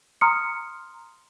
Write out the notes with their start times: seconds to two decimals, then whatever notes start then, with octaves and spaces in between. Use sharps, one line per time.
0.21 A#5 C6 D#6 F6 C#7